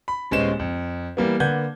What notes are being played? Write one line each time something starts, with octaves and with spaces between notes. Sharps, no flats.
B5
D#1 G#3 B3 C#4 C5 E7
F2
E3 G3 A#3 B3
D3 A#3 B4 F#5 G6 G#6